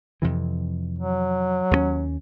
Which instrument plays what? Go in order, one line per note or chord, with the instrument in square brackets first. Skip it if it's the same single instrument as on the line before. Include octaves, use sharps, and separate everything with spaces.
[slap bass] F2 C3 E3
[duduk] F#3
[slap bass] D#2 G#3 C#4